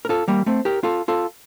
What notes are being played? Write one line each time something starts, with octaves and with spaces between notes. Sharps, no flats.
A#4
F4 A4
G3 A#3
A3 C4
G4 A#4
F4 A4
F4 A4